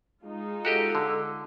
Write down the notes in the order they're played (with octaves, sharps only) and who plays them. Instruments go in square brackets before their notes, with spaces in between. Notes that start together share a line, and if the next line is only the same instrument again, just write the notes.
[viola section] G#3 D#4 F4
[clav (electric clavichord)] F#4 G4 D#5 [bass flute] A4
[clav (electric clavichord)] D3